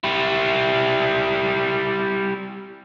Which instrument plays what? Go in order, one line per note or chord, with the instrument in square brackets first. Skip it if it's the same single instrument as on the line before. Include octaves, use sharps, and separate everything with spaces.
[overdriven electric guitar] G3 E4